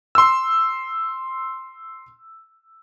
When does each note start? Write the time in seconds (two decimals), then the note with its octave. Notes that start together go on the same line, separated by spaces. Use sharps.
0.15 C6 E6